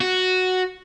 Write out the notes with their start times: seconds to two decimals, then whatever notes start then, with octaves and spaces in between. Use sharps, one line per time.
0.01 F#4